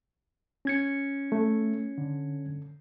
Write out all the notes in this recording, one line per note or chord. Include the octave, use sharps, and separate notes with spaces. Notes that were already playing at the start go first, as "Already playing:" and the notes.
C#4 G#6 C#7
A3
D3